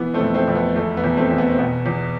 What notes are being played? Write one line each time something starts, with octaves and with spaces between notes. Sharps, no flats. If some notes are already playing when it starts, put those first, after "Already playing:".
Already playing: E3 B3
A3 C4
F2
A3 C4
F2
B3
E2 A3
B3
E2
A3 C4
E2
B3
C4
B2 B3
E2